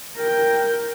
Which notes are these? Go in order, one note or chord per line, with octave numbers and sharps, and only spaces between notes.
A#4 G5